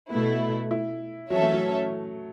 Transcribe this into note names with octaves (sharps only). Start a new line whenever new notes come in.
B2 A3 B3 E4
E4
E3 F#3 C#4 A4 C#5 E5
A3
F#3